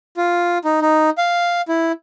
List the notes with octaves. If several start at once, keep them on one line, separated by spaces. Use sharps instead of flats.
F4
D#4
D#4
F5
E4